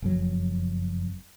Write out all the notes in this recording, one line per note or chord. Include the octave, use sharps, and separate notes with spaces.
F#1 F2 F#3